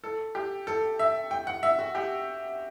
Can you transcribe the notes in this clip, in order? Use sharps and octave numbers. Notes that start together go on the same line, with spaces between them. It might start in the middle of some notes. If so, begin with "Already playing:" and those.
A4
G4
A4
E5
G5
F#5
E5
F#4
G4